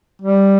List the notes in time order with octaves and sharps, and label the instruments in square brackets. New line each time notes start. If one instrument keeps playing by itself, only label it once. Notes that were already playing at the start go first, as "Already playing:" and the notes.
[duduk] G3